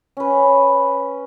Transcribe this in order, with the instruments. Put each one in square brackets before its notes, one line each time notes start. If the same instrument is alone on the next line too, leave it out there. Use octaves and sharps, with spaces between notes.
[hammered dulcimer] C#4 B4